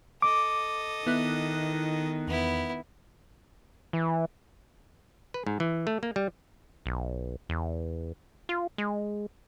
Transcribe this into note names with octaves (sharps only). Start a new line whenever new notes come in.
A4 D#5 D6
D#3 B3 E4 F#6
E2 B3 E4
E3
B4
G#2
E3
A3
A#3
G3
B1
E2
F4
G#3